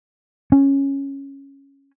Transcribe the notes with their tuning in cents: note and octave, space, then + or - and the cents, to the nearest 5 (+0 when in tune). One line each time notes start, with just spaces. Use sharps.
C#4 -5